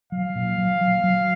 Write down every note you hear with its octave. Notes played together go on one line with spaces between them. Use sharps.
F#3 F5
A#2
F#3
F#3
F#3